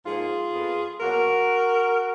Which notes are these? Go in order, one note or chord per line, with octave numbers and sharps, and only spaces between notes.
G#2 F3 A#3 F4 G#4
F2 F3 B3
B2 F#3 A#3 F#4 A#4